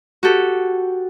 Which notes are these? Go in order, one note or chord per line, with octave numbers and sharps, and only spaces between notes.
F#4 G4 A4